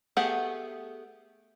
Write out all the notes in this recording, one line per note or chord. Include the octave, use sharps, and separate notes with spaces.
A3 B3 G4 G#4 F#5